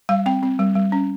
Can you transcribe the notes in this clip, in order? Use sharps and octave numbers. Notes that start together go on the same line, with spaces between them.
G3 F5
C4 G5
C4
G3
G3
C#4